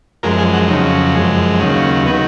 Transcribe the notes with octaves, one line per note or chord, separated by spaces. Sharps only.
F#2 F3 G#3 A#4
G#4
F#4
F2 C#3 F#3 D#4
F#2 F3 G#3
D#2 C#3 F#3
D#3 F#3 B3